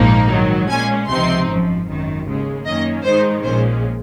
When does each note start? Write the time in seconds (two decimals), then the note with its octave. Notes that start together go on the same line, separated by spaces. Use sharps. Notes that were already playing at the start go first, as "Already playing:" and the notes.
Already playing: A#1 G#2 F3 A#3 D#4
0.31 G#2 D#3 F#3
0.69 A#2 G#3 C#4 G#5
1.09 C#2 C3 F3 C4 D#4 C6
1.47 G#1 F#2 F3
1.87 G#1 F#2 D#3
2.27 D#2 C#3 G#3
2.65 F#2 D#3 A#3 C#4 D#5
3.04 G#2 D#3 G#3 D#4 C5
3.43 A#1 A#2 G#3 C#4 C5